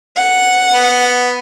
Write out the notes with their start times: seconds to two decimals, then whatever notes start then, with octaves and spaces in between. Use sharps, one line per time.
0.17 F#5
0.73 B3